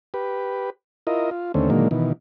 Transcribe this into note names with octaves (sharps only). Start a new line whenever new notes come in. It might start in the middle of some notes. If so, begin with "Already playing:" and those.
G4 B4
E4 F4 A#4 D#5
F4
D#2 D3 A3 C4 C#4
A#2 D3 D#3 F#3 G#3 A#3
B2 D#3 E3